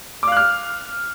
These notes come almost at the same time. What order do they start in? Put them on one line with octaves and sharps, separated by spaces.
D6 F5 F#6 F6